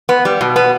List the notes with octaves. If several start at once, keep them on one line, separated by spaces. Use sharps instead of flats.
B3
G3
B2
B3